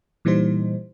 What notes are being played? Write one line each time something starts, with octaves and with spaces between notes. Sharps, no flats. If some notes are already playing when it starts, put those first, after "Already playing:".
A#2 E3 G3 D#4 C5